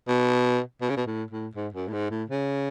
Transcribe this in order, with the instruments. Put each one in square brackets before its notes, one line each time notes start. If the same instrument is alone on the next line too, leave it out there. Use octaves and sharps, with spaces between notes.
[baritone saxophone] B2
B2
C#3
B2
A2
A2
G#2
F#2
A2
G#2
A2
C#3